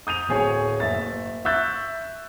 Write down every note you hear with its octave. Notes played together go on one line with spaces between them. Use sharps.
D#6 G6 D#7 F7
D1 G#4 C#5 C#6
F#1 E5 A6
E5 C#6 E6 F#6 G6 A6